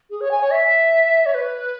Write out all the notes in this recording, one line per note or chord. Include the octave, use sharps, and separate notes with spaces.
G#4
C#5
G#5
C#5
E5
C#5
B4